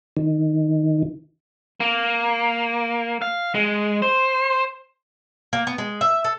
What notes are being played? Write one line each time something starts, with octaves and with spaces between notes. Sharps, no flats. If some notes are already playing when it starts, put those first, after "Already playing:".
D#3
A#3
F5
G#3
C5
A#3
B3
G#3
E5
A4